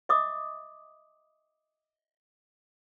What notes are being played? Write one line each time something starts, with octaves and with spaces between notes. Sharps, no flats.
D#5 E5 D6 D#6